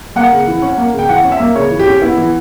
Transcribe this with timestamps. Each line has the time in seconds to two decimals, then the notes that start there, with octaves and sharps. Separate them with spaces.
0.16 A#3 F#5
0.32 C#3
0.47 E3
0.62 C#4
0.78 A#3
0.93 C#3
0.99 G5
1.09 E3 F#5
1.24 C#4
1.32 E5
1.40 A#3
1.56 C#3 C#5
1.71 E3
1.79 G4
1.87 C#4
2.02 B3 E4
2.18 E3